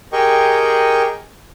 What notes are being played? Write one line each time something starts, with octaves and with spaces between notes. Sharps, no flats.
G4 G#4 A#4 D#5 G5 C#6